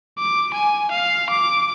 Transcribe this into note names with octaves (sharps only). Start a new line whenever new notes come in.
D6
G#5
F5
D6